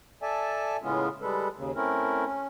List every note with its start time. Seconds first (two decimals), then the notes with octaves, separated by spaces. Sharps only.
0.22 A4 D5 E5 G#5 A5
0.82 A2 C#3 G#3 B3 C#4 F4
1.22 G3 G#3 A4 B4
1.56 D#2 C#3
1.75 A3 C4 C#4 E4 A#4
2.25 C#4